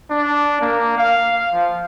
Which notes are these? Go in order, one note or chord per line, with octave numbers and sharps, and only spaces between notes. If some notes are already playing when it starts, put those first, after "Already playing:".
D4
A#3
F5
F3